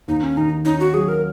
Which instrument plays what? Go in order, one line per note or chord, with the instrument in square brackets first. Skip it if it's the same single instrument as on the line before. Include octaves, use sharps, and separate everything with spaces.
[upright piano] D#2 [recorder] D#4
[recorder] C#4
[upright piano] D#3 [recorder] D#4
[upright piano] C#4 [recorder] D#4
[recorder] F#4
[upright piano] F#3 [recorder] G#4
[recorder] A#4